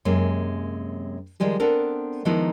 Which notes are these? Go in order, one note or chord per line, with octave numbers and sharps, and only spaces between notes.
F#2 C3 G#3 A#3
D#3 F3 G3 G#3 G#4
B3 C4 D4 A4 A#4
D#3 F3 G#3 B3 D#4 E4